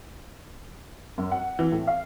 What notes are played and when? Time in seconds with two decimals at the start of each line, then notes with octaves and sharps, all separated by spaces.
1.18 F#2
1.32 F#5
1.59 E3
1.72 A2
1.87 F5